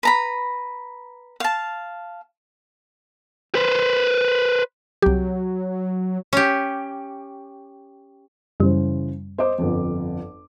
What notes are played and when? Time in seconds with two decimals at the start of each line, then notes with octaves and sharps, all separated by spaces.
0.03 B4 A#5 B5
1.40 F5 A5
3.55 B4 C5
5.02 C2 F#3 G4
6.33 C#4 G4
8.60 F#2 C#3 E3 G3 C5
9.38 C5 D#5 D6
9.59 G1 F2